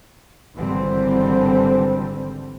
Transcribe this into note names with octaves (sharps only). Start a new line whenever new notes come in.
G#1 D3 E3 G3 C4